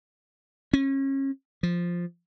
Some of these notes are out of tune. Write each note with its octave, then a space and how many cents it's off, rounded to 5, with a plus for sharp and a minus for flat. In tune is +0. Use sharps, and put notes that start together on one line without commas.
C#4 -30
F3 +0